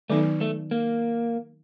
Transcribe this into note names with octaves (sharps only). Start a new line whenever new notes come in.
D#3 F#3 A3 B3 D#4
A3
A#3